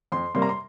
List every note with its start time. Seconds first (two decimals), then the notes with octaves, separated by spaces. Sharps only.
0.12 F2 C6
0.34 C3 G3 A#3 C6
0.42 A#5
0.49 C6